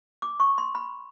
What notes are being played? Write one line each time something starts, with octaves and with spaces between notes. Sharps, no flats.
D6
C#6
C6
B5